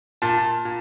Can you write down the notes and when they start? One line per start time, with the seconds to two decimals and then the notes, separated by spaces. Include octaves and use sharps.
0.22 A#2 A5
0.65 A#2